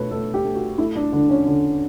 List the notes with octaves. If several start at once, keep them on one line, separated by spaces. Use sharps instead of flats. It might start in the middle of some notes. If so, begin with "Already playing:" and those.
Already playing: B2 A3 B4 C#5
A3 A4
G4
A3
F#4
A3 E4
D4
D3 D4
C#4
D3